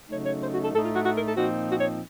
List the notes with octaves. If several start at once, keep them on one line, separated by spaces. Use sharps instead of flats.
C#3 F#3 A3 D#4 C#5
C#5
C5
F#4
A4
A2 A3 D#4 A4
F4
F#4
F#4
A#4
A4
A#2 F3 C4 D#4 F#4
F#4
C#5